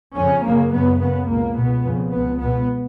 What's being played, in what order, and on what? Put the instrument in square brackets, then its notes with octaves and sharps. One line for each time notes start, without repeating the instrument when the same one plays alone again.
[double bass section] F2 C#3 C#4
F#2 C#3 A#3
F#2 C#3 B3
F#2 C#3 B3
C#2 B2 A#3
C#2 B2 B3
F2 C#3
C#2 B2 B3
C#2 B2 B3